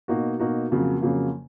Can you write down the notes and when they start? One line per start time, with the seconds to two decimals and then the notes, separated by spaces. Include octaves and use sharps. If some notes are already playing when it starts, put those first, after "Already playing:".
0.08 B2 A#3 D#4 F#4
0.39 B2 A#3 D#4 F#4
0.71 F2 C#3 F#3 A#3
1.02 F2 C#3 F#3 A#3